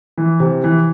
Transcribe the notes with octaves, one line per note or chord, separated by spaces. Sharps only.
E3
C3
E3